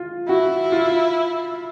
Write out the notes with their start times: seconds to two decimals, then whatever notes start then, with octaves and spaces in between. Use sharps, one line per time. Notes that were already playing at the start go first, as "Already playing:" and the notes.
Already playing: F4
0.29 E4 F#4
0.72 F4